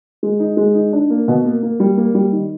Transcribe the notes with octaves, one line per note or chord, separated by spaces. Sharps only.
G#3
D#4
G#3
D#4
D4
A#3
B2
A#3
A#3
G3
A#3
G3
D#3